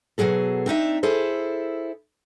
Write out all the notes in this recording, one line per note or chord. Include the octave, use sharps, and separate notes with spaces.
B2 E3 F#3 G#4 A4
C4 D4 D#4 E5
E4 G#4 A4 C5